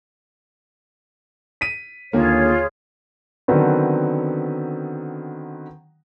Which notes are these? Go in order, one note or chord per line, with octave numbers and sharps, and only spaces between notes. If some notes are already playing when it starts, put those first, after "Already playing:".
B6 D#7
D#2 D3 A#3 F4 G#4 C#5
D3 D#3 F#3 B3 C4